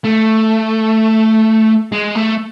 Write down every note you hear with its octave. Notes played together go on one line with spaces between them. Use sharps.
A3
G#3
A3